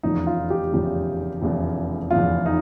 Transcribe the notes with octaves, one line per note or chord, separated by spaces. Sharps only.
F1 E2 C#3 F3 D#4
F4
G4
F1 E2 C#3 F3
F1 E2 C#3 F3
F1 E2 C#3 F3 F4
D#4